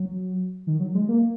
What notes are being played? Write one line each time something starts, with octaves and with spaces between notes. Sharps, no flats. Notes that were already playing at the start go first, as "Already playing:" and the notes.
Already playing: F#3
D#3
F#3
G#3
A#3